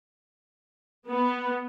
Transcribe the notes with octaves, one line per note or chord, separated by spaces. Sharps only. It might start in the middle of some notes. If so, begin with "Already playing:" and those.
B3